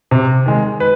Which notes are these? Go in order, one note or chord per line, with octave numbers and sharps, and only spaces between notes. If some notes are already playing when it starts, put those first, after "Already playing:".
C3
D#3 G#3
B4